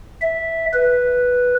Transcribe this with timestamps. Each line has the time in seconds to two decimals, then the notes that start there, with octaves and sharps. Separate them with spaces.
0.21 E5
0.73 B4